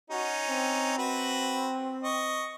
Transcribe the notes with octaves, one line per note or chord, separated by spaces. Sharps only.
C#4 D#4 F#4
C4
F#4 B4
D#5 C#6